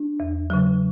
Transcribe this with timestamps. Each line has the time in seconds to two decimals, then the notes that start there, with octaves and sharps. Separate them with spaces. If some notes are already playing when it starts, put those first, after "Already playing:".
Already playing: D4
0.20 E2
0.50 C#3 F#3